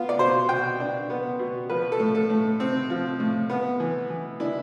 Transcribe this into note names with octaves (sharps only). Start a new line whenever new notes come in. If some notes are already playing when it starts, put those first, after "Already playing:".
Already playing: B3 F4
D5
B2 C5
B2 G5
D4
B3
B2
F3 B4
A4
A2
A4
A2
C4
F3
A2
B3
E3
E3
D4 E4